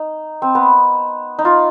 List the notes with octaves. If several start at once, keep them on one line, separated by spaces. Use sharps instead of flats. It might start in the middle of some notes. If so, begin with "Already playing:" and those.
Already playing: D#4
C4
B3
D#4
F4